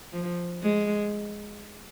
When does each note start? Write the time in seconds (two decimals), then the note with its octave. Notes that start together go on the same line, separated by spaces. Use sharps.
0.12 F3
0.63 G#3